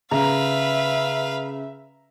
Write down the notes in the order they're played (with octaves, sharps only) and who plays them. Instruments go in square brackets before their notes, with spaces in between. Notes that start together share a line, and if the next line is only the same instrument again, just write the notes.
[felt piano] C#3 [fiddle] B4 F5 [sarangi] E5 [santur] A#5